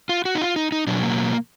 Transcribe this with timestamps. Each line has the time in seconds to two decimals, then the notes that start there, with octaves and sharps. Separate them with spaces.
0.09 F4
0.25 F#4
0.35 D#4
0.41 F4
0.56 D#4
0.72 D#4
0.87 B2 F#3 D4
1.03 A#3